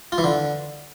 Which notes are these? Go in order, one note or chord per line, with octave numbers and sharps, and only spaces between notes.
F4
E3
D3